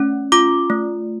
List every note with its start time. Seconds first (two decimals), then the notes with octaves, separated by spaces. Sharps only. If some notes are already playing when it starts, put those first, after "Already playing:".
Already playing: A3 C#4
0.32 F4 D6
0.70 A3